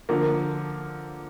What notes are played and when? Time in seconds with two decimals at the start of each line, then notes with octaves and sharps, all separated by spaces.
0.09 D3 F3 A#3